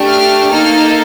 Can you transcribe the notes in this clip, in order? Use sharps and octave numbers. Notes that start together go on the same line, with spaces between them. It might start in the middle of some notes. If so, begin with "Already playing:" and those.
Already playing: A3 D4 G4
F6
A#3 D#4 A4 F6